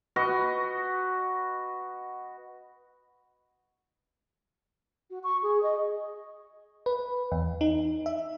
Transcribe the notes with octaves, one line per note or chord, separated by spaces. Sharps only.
F#4 B4 D#5
F#4
C#6
G#4
D#5
B4
E2
D#4
E5